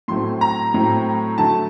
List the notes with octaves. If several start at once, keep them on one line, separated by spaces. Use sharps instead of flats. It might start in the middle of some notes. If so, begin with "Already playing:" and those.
A2 F#3 A3 C4 C6
A#5
A2 F#3 A3 C4
D3 F#3 A3 A5